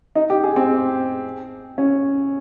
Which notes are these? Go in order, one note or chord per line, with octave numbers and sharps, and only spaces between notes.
D#4
G4
G#4
C4
C#4